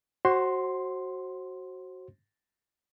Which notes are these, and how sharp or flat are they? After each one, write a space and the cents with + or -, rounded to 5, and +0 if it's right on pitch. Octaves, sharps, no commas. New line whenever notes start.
F#4 +10 C5 +30 C6 +0